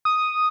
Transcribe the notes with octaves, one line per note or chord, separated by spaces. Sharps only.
D#6